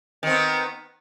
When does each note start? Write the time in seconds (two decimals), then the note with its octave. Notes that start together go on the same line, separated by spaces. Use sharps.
0.23 D#3
0.27 C4
0.31 B3